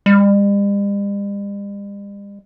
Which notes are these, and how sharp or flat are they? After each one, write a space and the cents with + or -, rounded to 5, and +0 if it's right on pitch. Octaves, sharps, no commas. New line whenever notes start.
G3 +45